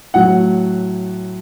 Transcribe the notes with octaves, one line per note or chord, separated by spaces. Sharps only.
A2 F#3 F#5